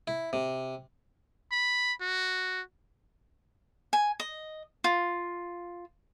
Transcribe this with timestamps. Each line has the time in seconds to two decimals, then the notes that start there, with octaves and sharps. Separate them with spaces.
0.07 E4
0.33 C3
1.52 B5
2.01 F#4
3.93 G#5
4.20 D#5
4.84 F4